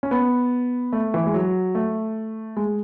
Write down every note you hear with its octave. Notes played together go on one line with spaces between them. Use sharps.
C#4
B3
A3
E3
G#3
F#3
A3
G#3